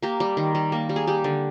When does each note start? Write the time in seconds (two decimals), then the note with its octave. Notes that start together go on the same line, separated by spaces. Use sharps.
0.02 A#3 G4
0.20 G3
0.37 D#3
0.55 G3
0.72 A#3
0.89 G3
0.96 G#4
1.07 G3 G4
1.24 D3